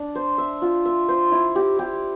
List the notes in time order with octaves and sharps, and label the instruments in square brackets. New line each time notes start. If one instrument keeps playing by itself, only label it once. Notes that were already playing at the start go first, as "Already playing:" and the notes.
Already playing: [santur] D4
C5
E5
F4
E5
C5
E4
G4
G4